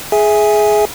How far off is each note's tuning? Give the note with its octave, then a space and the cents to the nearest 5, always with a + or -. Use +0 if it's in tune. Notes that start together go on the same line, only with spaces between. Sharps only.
G#4 +15 E5 -5 G#5 -5